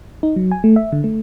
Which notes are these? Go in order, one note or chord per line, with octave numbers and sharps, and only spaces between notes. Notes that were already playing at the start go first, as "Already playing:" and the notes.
D#4
F#3
G#5
A3
E5
D3
A3